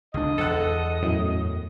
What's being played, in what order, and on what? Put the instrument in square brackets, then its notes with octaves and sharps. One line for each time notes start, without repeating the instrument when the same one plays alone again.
[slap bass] C#2 D4 [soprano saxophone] D#5
[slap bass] E2 [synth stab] A4 F#5
[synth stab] F#2 A2